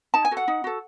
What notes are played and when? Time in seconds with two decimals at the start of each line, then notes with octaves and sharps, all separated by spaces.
0.14 D#4 A5
0.25 G#5
0.31 F#4 A4
0.37 F#5
0.48 D#4
0.64 F#4 A4